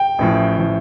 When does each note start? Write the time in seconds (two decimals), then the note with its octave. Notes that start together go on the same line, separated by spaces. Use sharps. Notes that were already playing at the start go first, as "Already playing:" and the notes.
Already playing: G5
0.18 A1 A2 F3
0.57 A2 F3